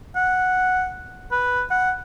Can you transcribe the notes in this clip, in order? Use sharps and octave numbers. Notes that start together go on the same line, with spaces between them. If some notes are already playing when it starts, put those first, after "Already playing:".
F#5
B4
F#5